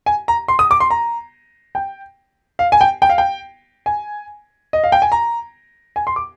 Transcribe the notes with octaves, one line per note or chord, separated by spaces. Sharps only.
G#5
A#5
C6
D#6
D6
C6
A#5
G5
F5
G#5
G5
G5
F5
G5
G#5
D#5
F5
G5
G#5
A#5
G#5
C6
D6